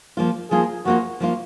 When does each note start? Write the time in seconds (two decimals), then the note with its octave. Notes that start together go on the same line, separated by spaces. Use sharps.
0.17 F3 A#3 F4
0.51 F3 A#3 F4 G#4
0.85 F3 A#3 F4 F#4
1.20 F3 A#3 F4